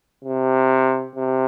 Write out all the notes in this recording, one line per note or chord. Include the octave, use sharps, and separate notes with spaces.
C3
C3